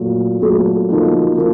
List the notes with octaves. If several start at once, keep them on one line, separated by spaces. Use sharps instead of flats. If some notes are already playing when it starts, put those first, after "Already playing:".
Already playing: A#2 F#3 A3
A#2 F#3 A3
F3 A#3 D#4 F#4
F3 A#3